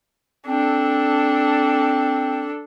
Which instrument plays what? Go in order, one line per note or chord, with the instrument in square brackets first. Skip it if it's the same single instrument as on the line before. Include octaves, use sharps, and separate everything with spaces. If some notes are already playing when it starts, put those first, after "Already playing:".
[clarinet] C4 [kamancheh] D4 A4